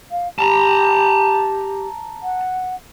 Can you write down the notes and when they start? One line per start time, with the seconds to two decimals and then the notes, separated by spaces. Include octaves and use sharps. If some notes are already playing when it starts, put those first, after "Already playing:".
0.11 F5
0.39 G4 A5 A#5
2.23 F#5